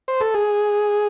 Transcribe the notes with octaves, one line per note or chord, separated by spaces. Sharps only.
C5
A4
G#4